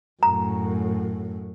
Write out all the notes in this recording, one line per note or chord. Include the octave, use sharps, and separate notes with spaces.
F#2 A2 A#5